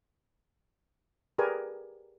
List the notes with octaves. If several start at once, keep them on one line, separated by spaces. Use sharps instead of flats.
G4 G#4 A#4 B4 D5 G#5